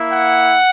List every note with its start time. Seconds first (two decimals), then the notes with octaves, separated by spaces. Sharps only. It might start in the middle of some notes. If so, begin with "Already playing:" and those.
Already playing: A#3 E4
0.11 F#5